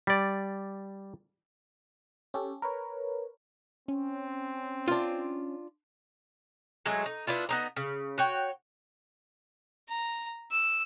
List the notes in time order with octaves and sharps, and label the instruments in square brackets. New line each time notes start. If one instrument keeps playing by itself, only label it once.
[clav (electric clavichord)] G3 D5
[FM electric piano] C#4 G4 A4
A#4 B4 C#5
[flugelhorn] C4 [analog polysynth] C#4
[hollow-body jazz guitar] D4 F4
[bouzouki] F#3 G#3 A3 D#5
D#4
B3 D4 E4 F4
B3 D#4 A#5
C#3
F#4 C#5 G5
[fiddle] A#5
E6